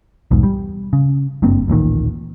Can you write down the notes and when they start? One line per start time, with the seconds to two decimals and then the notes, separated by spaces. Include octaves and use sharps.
0.31 B1 E2 G#2
0.43 G3
0.93 C#3
1.42 F#1 G2 A#3 C4
1.68 D1 A1 A#2 D#3